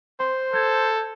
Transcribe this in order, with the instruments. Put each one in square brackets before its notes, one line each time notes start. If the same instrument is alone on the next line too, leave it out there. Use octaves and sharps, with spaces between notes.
[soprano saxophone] C5 [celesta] C6
[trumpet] A4 [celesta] G6 G#6